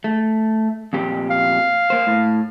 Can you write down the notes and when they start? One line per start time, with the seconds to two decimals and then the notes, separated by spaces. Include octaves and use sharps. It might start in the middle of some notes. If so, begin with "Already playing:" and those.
0.04 A3
0.93 F2 A#2 G4
1.30 F5
1.90 A#3 C5
2.07 A2